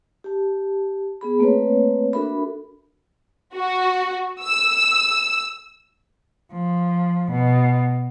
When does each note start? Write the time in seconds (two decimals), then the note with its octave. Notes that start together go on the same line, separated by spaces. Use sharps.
0.24 G4 A5
1.21 B3 G#4 B5
1.39 A3 A#3 C4 B4 C#5
2.13 D4 F#4 A4 A#4 E5 B5
3.55 F#4
4.44 E6
6.53 F3
7.32 B2